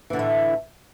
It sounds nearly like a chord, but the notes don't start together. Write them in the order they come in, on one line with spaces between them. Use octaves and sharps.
E3 D3 A2 A3